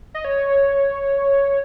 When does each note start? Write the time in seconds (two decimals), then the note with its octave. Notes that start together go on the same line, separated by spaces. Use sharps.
0.14 D#5
0.25 C#5